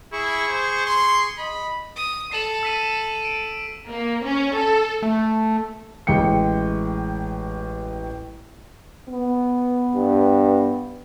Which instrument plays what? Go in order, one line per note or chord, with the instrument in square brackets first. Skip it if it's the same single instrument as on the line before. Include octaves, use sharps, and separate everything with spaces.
[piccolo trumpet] E4 [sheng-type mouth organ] G#4 C#6
[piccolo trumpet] C5
C6
[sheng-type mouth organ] D#5 [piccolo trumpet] B5
[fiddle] D#6
[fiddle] A4 [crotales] C7 E7 F#7
[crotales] E6 B6 D#7
D7
[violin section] A#3
C#4
A4
[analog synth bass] A3
[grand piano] A1 G#3 G5 C#7
[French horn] B3
[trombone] G2